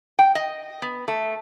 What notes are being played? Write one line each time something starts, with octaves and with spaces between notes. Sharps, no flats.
G5
D#5
B3
A3